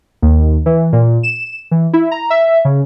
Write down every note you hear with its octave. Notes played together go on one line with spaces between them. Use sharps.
D#2
E3
A#2
E7
E3
E4
A#5
E5
C#3